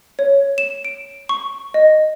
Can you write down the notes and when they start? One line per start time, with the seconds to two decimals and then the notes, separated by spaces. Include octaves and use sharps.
0.19 C#5
0.58 E7
0.85 D7
1.29 C#6
1.74 D#5